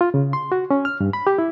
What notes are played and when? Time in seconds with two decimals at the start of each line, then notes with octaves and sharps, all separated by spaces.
0.01 F4
0.14 C#3
0.33 C6
0.52 F#4
0.71 C#4
0.85 F6
1.00 G2
1.13 B5
1.27 G4
1.38 E4